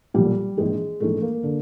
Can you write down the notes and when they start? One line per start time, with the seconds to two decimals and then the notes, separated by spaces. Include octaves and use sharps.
0.14 B1 A#2 G3
0.57 A#1 G#2 E3 G#3
1.00 A#1 G#2 E3 A3
1.22 A#3
1.43 D3